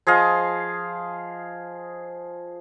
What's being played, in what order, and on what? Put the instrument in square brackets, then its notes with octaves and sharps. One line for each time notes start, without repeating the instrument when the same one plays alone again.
[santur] F3 G#4 D#5 F5